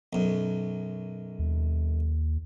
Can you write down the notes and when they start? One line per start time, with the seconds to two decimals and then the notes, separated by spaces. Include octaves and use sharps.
0.13 B1 F#2
1.39 D#2